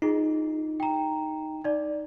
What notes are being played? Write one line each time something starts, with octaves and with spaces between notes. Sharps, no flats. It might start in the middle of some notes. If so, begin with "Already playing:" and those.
D#4 F4 G#4
G5 A#5
D#4 D5